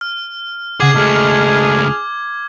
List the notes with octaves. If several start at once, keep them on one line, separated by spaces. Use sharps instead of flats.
F6
C#3 G#4 F#5 D6 G#6 C7
C#2 A3 D4 D#4 G#4 F6